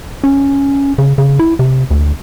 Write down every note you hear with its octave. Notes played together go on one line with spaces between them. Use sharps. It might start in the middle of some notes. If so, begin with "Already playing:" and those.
C#4
C#3
C#3
E4
C3
D2